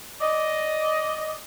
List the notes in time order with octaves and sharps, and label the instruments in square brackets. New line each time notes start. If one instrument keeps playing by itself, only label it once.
[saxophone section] D5 D#5